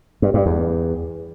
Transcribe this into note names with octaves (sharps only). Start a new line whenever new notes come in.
G2
G2
E2